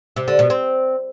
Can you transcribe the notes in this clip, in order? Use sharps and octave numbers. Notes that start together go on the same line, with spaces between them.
C3
D3
B2
C4